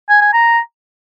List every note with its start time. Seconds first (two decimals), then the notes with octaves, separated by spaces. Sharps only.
0.10 G#5
0.22 G#5
0.33 A#5